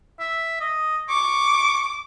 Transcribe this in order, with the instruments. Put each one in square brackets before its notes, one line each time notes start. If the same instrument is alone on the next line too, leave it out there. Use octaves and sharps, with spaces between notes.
[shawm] E5
D#5
[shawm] C#6 [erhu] D6